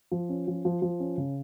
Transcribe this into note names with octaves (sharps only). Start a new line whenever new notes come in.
F3
C#4
F3
F3
F3
C#4
C#3